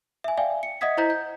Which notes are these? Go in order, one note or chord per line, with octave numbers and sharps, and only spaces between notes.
E5 G#5
D5 E5 F5 G5 G#5
C#7
D#5 E5 F#5 D#6 G#6 B6
E4 C5 D#5 A#5 G6 B6
G6